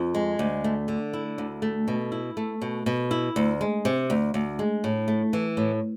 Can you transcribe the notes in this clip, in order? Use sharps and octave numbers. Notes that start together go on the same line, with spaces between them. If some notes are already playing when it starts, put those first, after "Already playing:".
Already playing: F2
G#3
D2
A3
D3
E4
D2
A3
B2
E4
A3
B2
B2
E4
D2
G#3
C3
D2
D2
G#3
A2
A3
E3
A2